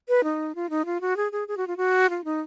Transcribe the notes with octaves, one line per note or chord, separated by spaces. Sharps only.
B4
D#4
F4
D#4
F4
F#4
G#4
G#4
G#4
F#4
F4
F#4
F4
D#4